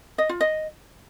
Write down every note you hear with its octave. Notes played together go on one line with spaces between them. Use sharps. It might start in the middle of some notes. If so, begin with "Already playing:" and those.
D#5
F4
D#5